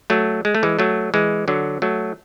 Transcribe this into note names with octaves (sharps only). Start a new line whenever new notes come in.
F#3 A3
G#3
A3
E3 G#3
F#3 A3
E3 G#3
D3 F#3
F#3 A3